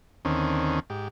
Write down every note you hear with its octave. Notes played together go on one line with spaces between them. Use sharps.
D#2 D3 D#3 C4 C#4
G#2 G4